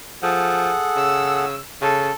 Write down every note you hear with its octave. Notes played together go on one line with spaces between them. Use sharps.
F3 G#4 A4 F#5
C#3 E6
C#3 A4